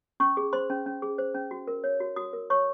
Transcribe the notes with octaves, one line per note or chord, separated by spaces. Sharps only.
C#4 C#6
G#4
C5 C6
C#4
C#4
G#4
C5
C#4
F#4
A#4
C#5
F#4
F#4 D#6
A#4
C#5 C#6